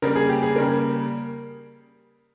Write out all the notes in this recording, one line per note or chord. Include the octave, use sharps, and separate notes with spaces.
C#3 G3 A#3 A#4
G#4
G4
G#4
C#3 G3 A#3 A#4